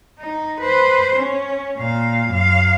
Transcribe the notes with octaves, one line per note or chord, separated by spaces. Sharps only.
D#4
B4 C5
C#4
A#2 F5
F#2 F5